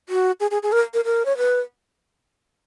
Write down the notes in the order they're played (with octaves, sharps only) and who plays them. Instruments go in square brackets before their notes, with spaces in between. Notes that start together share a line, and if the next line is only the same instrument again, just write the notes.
[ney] F#4
G#4
G#4
G#4
A#4
A#4
A#4
C#5
B4